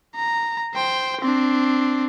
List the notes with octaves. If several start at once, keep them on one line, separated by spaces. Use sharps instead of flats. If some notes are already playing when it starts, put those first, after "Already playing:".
A#5
C5 G5
C4 D4